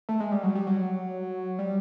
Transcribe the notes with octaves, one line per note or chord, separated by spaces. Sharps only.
A3
G#3
G3
F#3
G3
F#3
G3